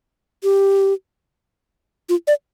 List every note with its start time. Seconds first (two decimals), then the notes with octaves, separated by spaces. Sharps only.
0.44 G4
2.09 F4
2.28 D5